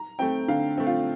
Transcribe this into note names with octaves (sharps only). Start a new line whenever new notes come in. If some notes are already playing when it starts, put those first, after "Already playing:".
Already playing: A#5
A3 C4 G5
D3 F5
A3 C4
F4